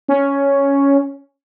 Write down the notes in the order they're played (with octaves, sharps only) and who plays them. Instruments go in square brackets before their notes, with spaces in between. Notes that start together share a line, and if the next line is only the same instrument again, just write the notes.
[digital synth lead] C#4